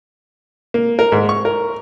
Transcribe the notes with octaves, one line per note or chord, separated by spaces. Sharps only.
A#3
A#4
G#2
C#6
A#4